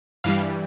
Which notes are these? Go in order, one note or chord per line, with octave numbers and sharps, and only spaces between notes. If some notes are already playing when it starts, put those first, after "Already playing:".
G2 E3 G3 F5